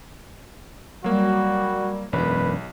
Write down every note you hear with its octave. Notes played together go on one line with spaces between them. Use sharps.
F#3 G3 A#3 F#4
E1 B1 F#2 B4